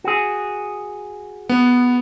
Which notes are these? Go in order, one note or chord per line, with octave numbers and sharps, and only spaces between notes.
F#4 G#4
B3